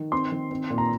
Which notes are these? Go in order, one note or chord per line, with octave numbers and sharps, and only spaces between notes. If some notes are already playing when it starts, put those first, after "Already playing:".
Already playing: D#3
C4 C6
D#3
C4
A#2
A#5